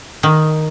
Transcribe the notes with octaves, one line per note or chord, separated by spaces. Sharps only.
D#3